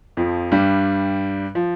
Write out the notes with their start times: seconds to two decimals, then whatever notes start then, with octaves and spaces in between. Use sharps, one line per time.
0.17 F2 F3
0.52 G2 G3
1.55 F3